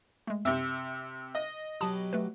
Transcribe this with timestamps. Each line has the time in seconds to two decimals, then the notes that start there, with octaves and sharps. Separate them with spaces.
0.27 G#3 A3
0.45 F#2 C3 C4 E5 D6
1.35 D#5
1.81 B2 F#3 G4 A5 B5 D#6
2.13 A3 B4